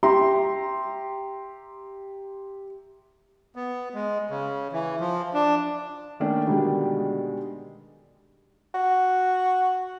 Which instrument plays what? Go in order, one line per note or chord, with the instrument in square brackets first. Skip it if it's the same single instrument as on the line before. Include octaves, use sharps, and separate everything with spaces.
[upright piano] G4 E5 A#5 C6
[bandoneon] B3
G#3
C#3
E3
F3
D4
[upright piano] D#3 A3 A#3 C#4 D4
B2 D3 D#3 G3 G#3
[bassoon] F#4